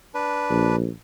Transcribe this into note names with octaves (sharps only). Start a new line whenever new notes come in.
D4 B4
A#1